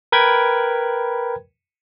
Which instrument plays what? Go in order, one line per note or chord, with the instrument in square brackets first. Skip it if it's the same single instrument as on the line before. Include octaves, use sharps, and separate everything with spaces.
[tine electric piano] A#4 B4 G5 B5 G#6